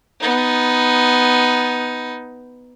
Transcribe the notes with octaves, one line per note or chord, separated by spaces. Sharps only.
B3 D#4